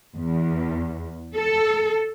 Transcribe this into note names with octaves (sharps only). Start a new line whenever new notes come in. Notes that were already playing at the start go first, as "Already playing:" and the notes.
E2
A4